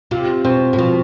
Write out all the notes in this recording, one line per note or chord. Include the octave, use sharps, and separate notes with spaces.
C3 F4
B2 C4
A2
B2 F3